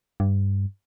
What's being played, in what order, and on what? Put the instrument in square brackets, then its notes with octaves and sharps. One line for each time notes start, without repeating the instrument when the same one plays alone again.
[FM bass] G2